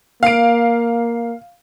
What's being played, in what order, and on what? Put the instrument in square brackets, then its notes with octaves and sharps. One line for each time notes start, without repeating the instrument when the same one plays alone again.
[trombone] A#3 [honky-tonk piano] F5 D7